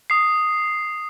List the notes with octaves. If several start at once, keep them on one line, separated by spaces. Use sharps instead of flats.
D#6 C7